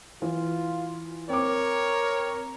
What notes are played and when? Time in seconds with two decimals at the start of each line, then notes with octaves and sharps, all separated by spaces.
0.22 E3 F4
1.30 C4 A#4 C#5 D6